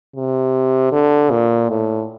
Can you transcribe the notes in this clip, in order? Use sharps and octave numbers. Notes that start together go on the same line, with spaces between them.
C3
D3
A#2
A2